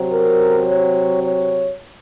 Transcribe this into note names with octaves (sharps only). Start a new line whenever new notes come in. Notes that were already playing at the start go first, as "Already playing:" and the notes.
Already playing: C3 F#3 C4
A#4
C#5
C#5